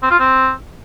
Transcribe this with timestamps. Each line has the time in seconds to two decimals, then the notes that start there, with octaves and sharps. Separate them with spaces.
0.03 C4
0.11 F4
0.19 C4